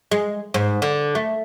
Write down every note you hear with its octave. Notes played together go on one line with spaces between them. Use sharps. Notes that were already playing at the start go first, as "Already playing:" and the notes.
G#3
G#2
D3
A3